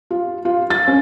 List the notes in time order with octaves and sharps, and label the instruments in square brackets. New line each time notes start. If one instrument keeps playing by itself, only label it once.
[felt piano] F4
F4
A6
C#4